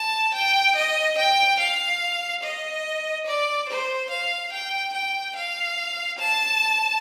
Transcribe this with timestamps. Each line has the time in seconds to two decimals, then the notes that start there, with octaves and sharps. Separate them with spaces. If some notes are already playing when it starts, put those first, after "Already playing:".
Already playing: A5
0.34 G5
0.76 D#5
1.18 G5
1.59 F5
2.43 D#5
3.26 D5
3.69 C5
4.10 F5
4.53 G5
4.94 G5
5.36 F5
6.19 A5